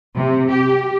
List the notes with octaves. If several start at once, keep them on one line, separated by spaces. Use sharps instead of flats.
C3
G4